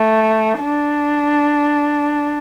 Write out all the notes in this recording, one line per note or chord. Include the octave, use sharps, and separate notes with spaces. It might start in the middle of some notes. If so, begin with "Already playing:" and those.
Already playing: A3
D4